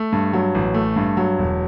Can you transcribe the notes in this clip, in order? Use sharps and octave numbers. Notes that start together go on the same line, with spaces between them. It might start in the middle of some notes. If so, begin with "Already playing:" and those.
Already playing: A3
G2
F#3
A1
A3
G2
F#3
E1